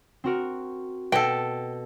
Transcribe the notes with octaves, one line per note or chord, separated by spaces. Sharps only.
C4 F#4 A#4
B2 A4 G5